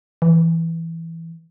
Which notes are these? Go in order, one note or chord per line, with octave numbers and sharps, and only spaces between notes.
E3